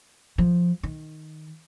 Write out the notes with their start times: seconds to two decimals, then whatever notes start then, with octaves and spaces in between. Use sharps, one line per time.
0.38 F3
0.83 D#3